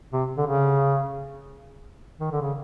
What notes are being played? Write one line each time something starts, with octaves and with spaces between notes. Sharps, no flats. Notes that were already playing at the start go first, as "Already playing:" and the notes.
C3
D3
C#3
D#3
D3
C#3